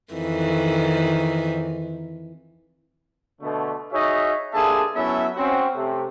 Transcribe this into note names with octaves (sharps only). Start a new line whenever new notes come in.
F2 D#3 E3
B2 D3 A3
D#4 F#4 G#4 C#5 E5
G2 D3 A#3 G#4 E5 A5
F#3 B3 C#4 E4 A4 E5
C4 C#4 F#4
C3 A3